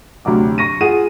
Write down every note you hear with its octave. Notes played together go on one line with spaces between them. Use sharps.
D2 C3 F#3 D6
C#6 A#6 D#7
F4 G#4 F#5 D#7